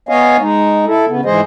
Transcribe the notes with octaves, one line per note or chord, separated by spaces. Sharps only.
B3 C#5 D#5 F5 G#5
G#3 D#4
E4 A4
C#3 B3
G#2 E3 G#3 G#4 C5 D#5